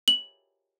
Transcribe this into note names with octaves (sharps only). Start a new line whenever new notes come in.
F#7